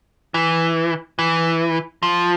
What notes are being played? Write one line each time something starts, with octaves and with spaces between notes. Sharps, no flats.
E3
E3
F3